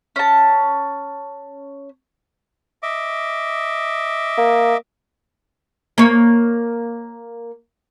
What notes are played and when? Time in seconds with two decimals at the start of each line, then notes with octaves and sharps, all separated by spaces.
0.16 C#4 A5
2.83 D#5 E5 D6
4.38 A#3
5.98 A#3 C#5